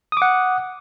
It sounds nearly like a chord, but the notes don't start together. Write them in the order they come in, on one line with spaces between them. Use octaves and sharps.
D#6 D6 F#5